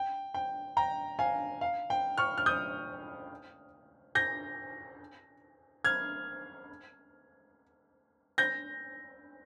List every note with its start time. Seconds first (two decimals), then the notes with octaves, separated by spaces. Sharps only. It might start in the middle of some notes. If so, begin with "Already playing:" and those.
Already playing: G5
0.34 G5
0.77 G5 A#5
1.19 F5 G#5
1.61 F5
1.90 G5
2.18 C#6 F6
2.38 F6
2.46 D#6 G6
4.15 G6 A#6
5.85 F6 G#6
8.38 G6 A#6